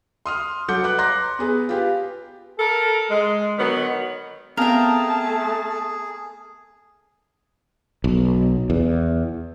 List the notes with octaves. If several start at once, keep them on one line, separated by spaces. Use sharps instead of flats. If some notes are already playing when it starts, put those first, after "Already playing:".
C6 D#6 F6
F#3 A4 F#5 D6 G6 C#7
B4 D6 F#6
A#5 C6 D6 F#6 A#6
B3 G#4 B4
F4 G4 B4
A4 A#4
G#3
D3 D#3 F#3 B3
A3 B3 C4 G#4 A#4 F5 G5 A5
B1
E2